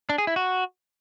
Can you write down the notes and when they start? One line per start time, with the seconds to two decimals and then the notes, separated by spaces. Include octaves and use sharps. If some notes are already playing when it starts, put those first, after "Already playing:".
0.10 D4
0.18 G#4
0.27 E4
0.36 F#4